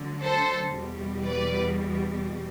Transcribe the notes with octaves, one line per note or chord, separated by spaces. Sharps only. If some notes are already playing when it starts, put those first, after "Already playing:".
Already playing: D2 D3 F#3
A4 C5
E2 B2 G3
B4 D5